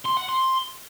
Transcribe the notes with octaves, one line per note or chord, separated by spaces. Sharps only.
C6
F#5
C6